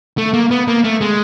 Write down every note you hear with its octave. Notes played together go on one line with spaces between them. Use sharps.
A3
A#3
B3
A#3
A3
G#3